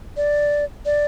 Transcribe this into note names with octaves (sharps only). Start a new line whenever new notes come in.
D5
D5